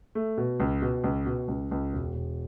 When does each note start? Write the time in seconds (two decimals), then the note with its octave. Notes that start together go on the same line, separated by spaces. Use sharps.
0.15 A3
0.38 B2
0.60 C#2
0.82 B2
1.04 C#2
1.26 B2
1.48 C#2
1.71 C#2
1.93 E1
2.15 E1